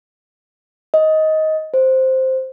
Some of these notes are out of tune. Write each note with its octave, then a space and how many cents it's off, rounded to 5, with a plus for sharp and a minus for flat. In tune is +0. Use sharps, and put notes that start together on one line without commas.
D#5 +15
C5 +0